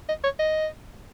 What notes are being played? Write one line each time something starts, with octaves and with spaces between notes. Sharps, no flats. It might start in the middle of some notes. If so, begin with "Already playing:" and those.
D#5
C#5
D#5